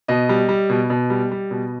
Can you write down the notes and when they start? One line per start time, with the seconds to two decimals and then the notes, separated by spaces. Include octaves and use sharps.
0.08 B2 D#5
0.29 G3
0.49 G3
0.70 B2
0.90 B2
1.10 G3
1.32 G3
1.51 B2